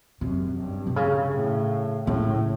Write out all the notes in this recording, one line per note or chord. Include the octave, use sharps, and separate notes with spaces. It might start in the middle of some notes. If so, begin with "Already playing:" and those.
F#2 C3
G2
C3
C#3
A2
A2 C#3